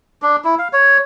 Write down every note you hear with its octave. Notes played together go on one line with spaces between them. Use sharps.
D4
E4
F5
C#5